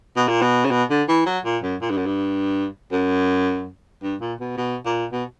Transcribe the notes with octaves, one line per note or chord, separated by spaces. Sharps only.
B2
A#2
B2
C#3
B2
D3
E3
F#3
A#2
F#2
A#2
G2
F#2
G2
F#2
G2
A#2
B2
B2
A#2
B2